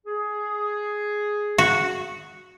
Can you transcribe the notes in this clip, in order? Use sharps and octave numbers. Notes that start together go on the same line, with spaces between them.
G#4
F#4